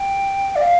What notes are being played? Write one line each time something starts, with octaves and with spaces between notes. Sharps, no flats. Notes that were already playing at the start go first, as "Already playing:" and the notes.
Already playing: G5
D5
F5